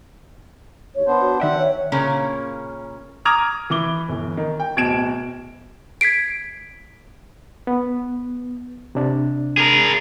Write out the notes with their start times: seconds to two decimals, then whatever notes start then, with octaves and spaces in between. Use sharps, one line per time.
0.95 D#2 C#5
1.07 B3 D4 C5
1.20 F#4
1.40 D#3 D5 E5 F#5 G5
1.58 C#5
1.92 A#2 C#3 A#3 C#4 G#4
3.25 A#5 D6 D#6 F6 G#6 F7
3.70 E3 E4 D6 G7
4.09 G1 E3
4.37 D#3
4.60 G5
4.76 D1 B2 G#6 D7 E7
6.01 G#6 B6 C7 D7
7.67 B3
8.95 C3 D4
9.57 G#4 A#4